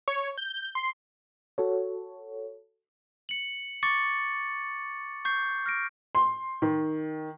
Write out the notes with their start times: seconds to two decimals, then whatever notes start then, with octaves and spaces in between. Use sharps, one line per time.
0.08 C#5
0.38 G6
0.75 C6
1.58 F#4 A4 C#5
3.29 C#7 F#7
3.83 C#6 D6 A6 C#7
5.25 C#6 G6 C7
5.66 F6 A#6 D7
6.15 C6
6.62 D#3